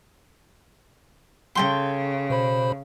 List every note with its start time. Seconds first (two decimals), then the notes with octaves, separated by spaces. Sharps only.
1.55 C#3 A4 G5 C6
2.30 B2 C5 B5